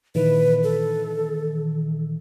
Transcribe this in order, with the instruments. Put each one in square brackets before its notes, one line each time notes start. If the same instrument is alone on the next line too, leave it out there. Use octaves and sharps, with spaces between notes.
[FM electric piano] A#2 D#3 E3 [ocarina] B4
[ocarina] A4